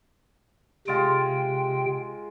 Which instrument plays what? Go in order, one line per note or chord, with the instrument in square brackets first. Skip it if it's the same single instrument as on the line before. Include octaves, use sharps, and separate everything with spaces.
[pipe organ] C3 G5 [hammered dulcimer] G#3 F4